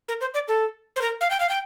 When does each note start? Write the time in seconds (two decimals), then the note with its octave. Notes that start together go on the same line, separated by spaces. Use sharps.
0.08 A#4
0.21 C5
0.34 D5
0.48 A4
0.96 C5
1.01 A#4
1.21 F5
1.31 G5
1.40 F5
1.49 G5